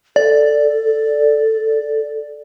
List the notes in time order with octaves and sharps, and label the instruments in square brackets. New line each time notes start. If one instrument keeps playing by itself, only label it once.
[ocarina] A4 [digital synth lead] D5